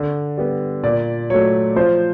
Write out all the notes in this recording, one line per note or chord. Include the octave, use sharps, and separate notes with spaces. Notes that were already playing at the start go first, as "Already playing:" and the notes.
Already playing: D3 D5
G3 B3
A#2 D5
F#3 A3 C#5
F3 C5